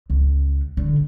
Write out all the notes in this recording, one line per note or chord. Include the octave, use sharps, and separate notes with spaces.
C#2
D3